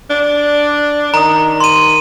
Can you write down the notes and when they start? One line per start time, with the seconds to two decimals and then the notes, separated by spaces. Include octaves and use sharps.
0.10 D4
1.14 D#3 A#5 D#6
1.60 C6 D#7